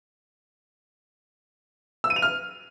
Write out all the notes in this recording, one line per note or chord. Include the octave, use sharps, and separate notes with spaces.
E6
D#7
F7
F6